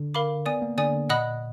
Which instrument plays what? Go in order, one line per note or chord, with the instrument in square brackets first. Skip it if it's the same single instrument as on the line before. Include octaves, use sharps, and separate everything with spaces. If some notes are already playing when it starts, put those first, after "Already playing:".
Already playing: [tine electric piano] D3
[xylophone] A#4 F5 B5 D6
[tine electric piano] B3 [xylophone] D5 G#5 D#6
[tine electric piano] A#3
[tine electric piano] D3 [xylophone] D5 G#5 D#6
[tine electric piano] A#2 [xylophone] D#5 F#5 B5 D#6 F#6